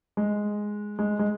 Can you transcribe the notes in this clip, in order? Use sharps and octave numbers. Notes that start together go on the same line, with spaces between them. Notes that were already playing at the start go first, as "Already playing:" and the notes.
G#3
G#3
G#3